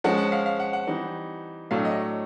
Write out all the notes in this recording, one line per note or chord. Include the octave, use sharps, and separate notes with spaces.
F3 G#3 C#4 F#5
F#5
F5
F5
F#5
F#5
E3 G3 C4 D#4
A2 F#3 A3 D4 F5
D#5